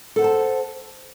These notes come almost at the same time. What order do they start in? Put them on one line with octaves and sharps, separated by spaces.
A4 F#5 C5 A5